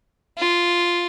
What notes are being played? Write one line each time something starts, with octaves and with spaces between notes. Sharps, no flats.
F4